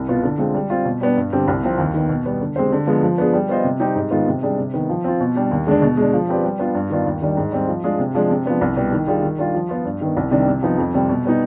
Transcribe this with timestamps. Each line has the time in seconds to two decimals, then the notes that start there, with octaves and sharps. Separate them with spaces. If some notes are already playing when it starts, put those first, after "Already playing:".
Already playing: C2
0.08 B2 B3 F4
0.23 D3
0.38 G#3 C4 F4
0.54 G3
0.70 C4 F4
0.85 B2
1.01 G3 B3 D4
1.17 G2
1.33 D3 G3 C4 G4
1.48 C2
1.63 C3 F3 C4
1.78 D#2
1.94 D#3 B3
2.09 B2
2.26 G3 B3
2.41 D3
2.56 G#3 C4 G4 C5
2.72 D3
2.87 F3 G#3 B3
3.03 F3
3.18 B3 D4 G#4
3.33 G3
3.49 B3 F4 C5 D#5
3.64 C3
3.80 G3 C4 D#4 G4
3.95 G#2
4.11 D#3 G#3 B3 F4
4.27 C3
4.42 G3 D4 G#4
4.58 C3
4.74 D#3 B3
4.89 F3
5.04 C4 F4
5.20 B2
5.35 G3 D4 G4
5.51 D#2
5.67 D3 G#3 D4
5.82 B2
5.97 G#3 D4
6.14 F3
6.29 C4 G4 B4 D5
6.44 G3
6.59 B3 D4 F4
6.75 G2
6.90 D#3 B3 D4 F4
7.06 D#2
7.22 D#3 G3 D4
7.37 G#2
7.52 G3 C4
7.68 F3
7.84 G#3 D4 F4 G#4
7.99 C3
8.15 F3 G#3 D4
8.30 C3
8.46 F3 B3 D4
8.61 C2
8.76 B2 G3 B3
8.92 D#3
9.07 G3 D4 F4 G#4
9.23 D#3
9.39 G3 D4 F4
9.54 F3
9.69 B3 F4
9.85 G2
10.01 D#3 B3
10.17 C2
10.31 C3 D#3 G3 D4
10.48 C3
10.63 F3 B3 D#4
10.78 F2
10.94 C3 G3 C4
11.09 B2
11.24 G3 B3 D#4